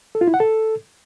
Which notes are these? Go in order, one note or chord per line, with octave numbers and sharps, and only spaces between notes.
A4
F4
E4
F#5
A4